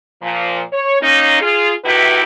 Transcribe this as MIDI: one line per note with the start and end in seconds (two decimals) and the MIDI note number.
0.21 0.61 46
0.21 0.61 53
0.72 0.96 73
1.01 1.40 58
1.01 1.40 61
1.01 1.40 63
1.41 1.72 65
1.41 1.72 68
1.84 2.21 51
1.84 2.21 57
1.84 2.21 64
1.84 2.21 66
1.84 2.21 67
1.84 2.21 71